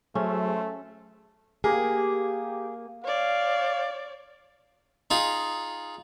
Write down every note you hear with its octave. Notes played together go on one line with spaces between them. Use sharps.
F#3 A3 C#4 G#4 C5 E5
A#3 G4 G#4
C#5 D5 F5
D#4 F4 G#4